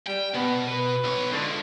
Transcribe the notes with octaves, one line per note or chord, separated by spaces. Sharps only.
G3 G5
B2 B3
B4
B1 C#5
D3 F3 G#3